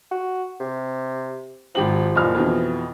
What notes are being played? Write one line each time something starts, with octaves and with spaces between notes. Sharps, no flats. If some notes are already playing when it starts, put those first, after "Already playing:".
F#4
C3
G#1 F3 G4 F#7
F#1 A#2 F6
F2 B2 E3